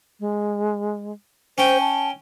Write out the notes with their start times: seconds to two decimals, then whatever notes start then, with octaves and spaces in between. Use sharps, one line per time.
0.20 G#3
1.58 C#4 C5 G5
1.81 A5